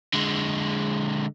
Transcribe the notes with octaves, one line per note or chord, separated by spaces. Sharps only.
D3 G#3